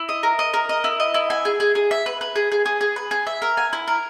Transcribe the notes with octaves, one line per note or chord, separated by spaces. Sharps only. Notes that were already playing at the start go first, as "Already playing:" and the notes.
Already playing: E4
D#5
A#4
D#5
A#4
D#5
E4
D#5
E4
G#5
G#4
G#4
G#4
E5
B4
B4
G#4
G#4
G#4
G#4
B4
G#4
E5
A#4
G#5
E4
A#4